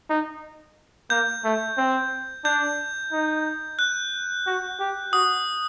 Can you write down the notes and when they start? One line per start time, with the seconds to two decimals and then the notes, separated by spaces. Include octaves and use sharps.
0.09 D#4
1.10 A#3 G6
1.44 A3
1.77 C4
2.44 D4 G6
3.12 D#4
3.79 F#6
4.46 F#4
4.79 G4
5.13 F#4 D#6